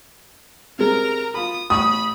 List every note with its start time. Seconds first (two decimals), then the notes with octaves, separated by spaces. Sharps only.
0.79 C3 G#3 A#4 A#5
1.34 F4 B5 D#6
1.70 A1 B5 C#6 D#6